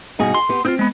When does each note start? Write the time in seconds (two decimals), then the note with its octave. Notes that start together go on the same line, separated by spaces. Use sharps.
0.19 G2 B2 D#4 F#4 G#4
0.34 C6
0.49 B3 G4
0.65 C4 D#4 F4
0.79 G#3 B3